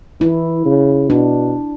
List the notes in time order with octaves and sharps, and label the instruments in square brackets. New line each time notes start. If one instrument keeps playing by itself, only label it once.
[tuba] E3 [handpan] E4
[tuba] C#3
[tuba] B2 [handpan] D4